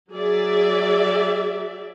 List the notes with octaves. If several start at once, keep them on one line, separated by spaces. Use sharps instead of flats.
F#3 G#4 D5 E5